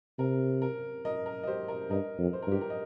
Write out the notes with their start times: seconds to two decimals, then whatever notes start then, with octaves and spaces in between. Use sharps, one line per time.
0.19 C3 A#4
0.62 A#4
1.05 A#4 D#5
1.26 A#4
1.43 D#5
1.47 G4 C5
1.68 A#4 D#5
1.90 G2 A#4 D#5
2.19 F2
2.33 C5
2.42 A#4
2.47 G2
2.52 G4
2.61 A#4
2.70 D#5